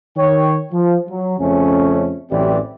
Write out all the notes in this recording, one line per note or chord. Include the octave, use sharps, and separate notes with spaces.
D#3 C#5 G5
F3
F#3
F2 C#3 A3 C#4
A1 F#2 E3 C4 G4 D5